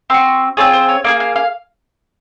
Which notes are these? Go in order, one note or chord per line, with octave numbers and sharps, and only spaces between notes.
C4 F#4 C6
C4 F4 G#4 C#5
C5
C#5
A#3 D#4 G#4 F5
F5
F5